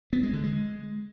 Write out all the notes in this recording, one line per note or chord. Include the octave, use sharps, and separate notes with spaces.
B3
G#3
D3
G#3